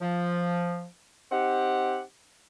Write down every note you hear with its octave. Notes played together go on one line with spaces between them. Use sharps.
F3
C4 D#4 G4 F#5